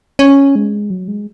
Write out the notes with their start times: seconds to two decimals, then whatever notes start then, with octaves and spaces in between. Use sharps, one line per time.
0.19 C#4
0.56 G#3
0.90 F#3
1.08 G#3